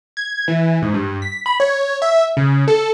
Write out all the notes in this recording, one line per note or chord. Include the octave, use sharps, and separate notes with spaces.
G#6
E3
G#2
G2
B6
B5
C#5
E5
C#3
A4